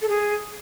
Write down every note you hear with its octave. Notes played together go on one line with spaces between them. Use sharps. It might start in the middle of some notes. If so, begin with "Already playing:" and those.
A4
G#4